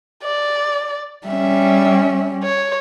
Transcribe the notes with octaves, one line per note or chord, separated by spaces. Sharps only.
D5
G3 C#4 E5
C#5